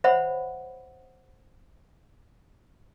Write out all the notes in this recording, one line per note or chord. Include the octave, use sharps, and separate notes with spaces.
C5 C#5 E5 F#5 B5